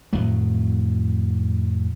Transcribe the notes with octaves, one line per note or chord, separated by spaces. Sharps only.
F2 A2 D#3 F#3